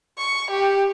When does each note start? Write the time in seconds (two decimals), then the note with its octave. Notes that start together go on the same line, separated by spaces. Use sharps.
0.18 C#6
0.51 G4